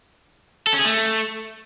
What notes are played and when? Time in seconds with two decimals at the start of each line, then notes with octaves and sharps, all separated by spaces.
0.67 A4
0.73 C#4
0.79 G#4
0.85 A3